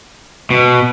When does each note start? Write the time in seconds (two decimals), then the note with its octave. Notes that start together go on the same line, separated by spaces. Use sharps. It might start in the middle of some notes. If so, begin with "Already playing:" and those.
0.50 B2